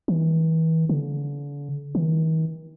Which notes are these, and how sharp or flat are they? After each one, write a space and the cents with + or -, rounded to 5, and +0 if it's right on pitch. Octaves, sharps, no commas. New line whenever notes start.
E3 -35
D3 -40
D#3 +45